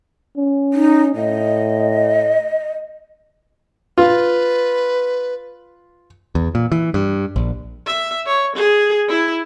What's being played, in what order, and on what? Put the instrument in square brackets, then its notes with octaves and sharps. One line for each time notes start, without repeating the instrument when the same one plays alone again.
[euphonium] C#4
[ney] D#4
[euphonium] A2 [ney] D#5
[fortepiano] F4 [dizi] B4
[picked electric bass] E2
A#2
E3
G2
A#1
[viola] E5
C#5
G#4
E4